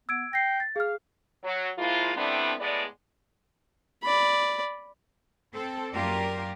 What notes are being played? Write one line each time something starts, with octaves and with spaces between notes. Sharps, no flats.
B3 E6 G#6 D7
G5 A#6 C7
A6
G#4 F5 F6
F#3
F3 G#3 A#3 E4 F4
G3 A3 B3 C4 D4 E4
A2 G#3 B3 D5
D5 B5
C4 A4
F#2 A#3 F4 G4 A#4 D5